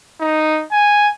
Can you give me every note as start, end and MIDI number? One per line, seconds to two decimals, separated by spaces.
0.20 0.63 63
0.72 1.08 80